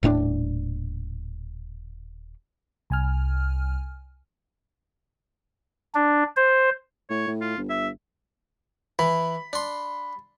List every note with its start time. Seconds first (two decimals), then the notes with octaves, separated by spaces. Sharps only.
0.03 D#1 A2 A#3 D4
2.90 C2 G#5 F6
5.95 D4
6.37 C5
7.10 A2 C#5
7.27 A2
7.41 F4
7.57 G1
7.70 E5
8.99 E3 B5
9.53 D4 C6